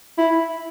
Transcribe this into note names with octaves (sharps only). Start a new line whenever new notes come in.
E4